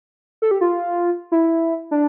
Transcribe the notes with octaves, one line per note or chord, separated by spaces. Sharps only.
A4
G4
F4
E4
D4